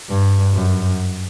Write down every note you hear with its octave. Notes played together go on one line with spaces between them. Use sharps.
G2
F#2